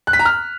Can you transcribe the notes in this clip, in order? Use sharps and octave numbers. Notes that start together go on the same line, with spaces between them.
F#6
B6
A#5
F6